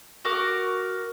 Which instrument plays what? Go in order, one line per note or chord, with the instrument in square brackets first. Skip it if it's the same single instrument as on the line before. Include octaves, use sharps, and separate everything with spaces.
[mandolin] F#4 A#4 D6